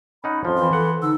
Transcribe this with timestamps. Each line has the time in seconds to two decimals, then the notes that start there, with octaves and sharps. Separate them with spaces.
0.24 C#4 D#4 F#5 B5
0.45 F2 F3 C6
0.57 E3 F4
0.73 A4 F#5
1.02 D3 D#4 E6